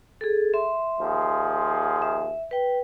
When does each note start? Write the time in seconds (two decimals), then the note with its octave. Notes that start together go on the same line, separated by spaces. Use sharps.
0.21 G#4 A4
0.54 E5 C6
1.01 D#2 F3 G#4
2.02 E5
2.51 B4 G5